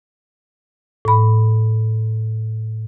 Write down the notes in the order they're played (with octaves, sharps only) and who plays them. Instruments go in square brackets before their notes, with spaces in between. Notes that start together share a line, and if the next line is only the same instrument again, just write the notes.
[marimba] A2 B5